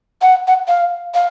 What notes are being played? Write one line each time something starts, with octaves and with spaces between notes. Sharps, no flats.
F#5
F#5
F5
F5